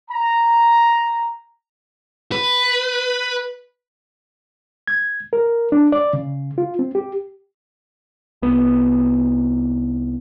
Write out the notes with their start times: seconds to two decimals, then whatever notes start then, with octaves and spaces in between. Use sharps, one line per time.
0.11 A#5
2.32 B4
4.88 G#6
5.33 A#4
5.72 D4
5.92 D5
6.13 C#3
6.58 F4
6.79 C4
6.95 G4
8.42 C2 B3